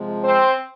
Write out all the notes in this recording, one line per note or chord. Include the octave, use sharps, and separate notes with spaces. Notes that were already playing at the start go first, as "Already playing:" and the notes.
Already playing: C3 F3 G#3
C4 C5